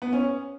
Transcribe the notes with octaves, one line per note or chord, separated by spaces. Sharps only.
B3
C#4